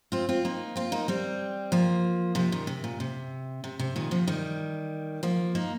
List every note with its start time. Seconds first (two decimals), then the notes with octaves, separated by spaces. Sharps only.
0.12 C4 F4
0.29 C4 F4
0.45 A#3 D#4
0.76 C4 F4
0.92 A#3 D#4
1.08 G3 C4
1.72 F3 A#3
2.35 C3 F3
2.52 A#2 D#3
2.67 C3
2.84 A#2
3.00 C3
3.64 C3
3.79 C3
3.96 A#2 D#3
4.11 C3 F3
4.28 D#3 G3
5.23 F3 A#3
5.55 A#3 D#4